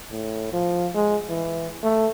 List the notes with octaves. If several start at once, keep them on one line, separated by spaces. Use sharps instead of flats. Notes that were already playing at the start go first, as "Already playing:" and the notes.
A2
F3
G#3
E3
A3